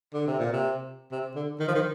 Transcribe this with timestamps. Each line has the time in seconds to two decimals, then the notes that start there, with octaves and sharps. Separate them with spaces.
0.14 D3
0.27 C3
0.40 A#2
0.53 C3
1.12 C3
1.36 D3
1.60 D#3
1.68 F3
1.75 D#3